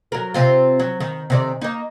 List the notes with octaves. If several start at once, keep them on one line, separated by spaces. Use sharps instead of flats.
F#3 A#4
C3 C4 F4
F#3
D#3
C3 D#3 D5
A#3 D#4